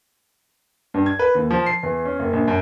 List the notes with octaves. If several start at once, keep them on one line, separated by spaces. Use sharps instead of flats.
G2
G#6
B4
D#2
F3
C7
E2
C#4
F#1
A#1
F#2